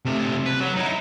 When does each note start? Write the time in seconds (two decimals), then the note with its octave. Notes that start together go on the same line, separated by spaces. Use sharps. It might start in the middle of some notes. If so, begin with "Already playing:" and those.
0.05 C3 A3
0.46 B4
0.60 F#3
0.77 D#4 E4